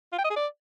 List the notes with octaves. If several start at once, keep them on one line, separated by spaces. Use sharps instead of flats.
F4
G5
D#5
G#4
D5